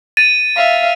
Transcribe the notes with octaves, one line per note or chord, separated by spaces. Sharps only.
A6 D#7
E5 F5